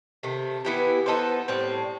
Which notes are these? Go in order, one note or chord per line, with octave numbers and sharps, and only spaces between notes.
C3 D#3 A3
E3 B3 E4 G4
B3 D#4 A4 C5
A2 G3 C4